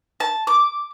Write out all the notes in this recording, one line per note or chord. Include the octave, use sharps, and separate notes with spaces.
A5
D6